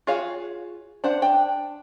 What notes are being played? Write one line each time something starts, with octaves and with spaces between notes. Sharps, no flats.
F4 F#4 G#4 C#5 F5
D4 C5 F#5
D4 G5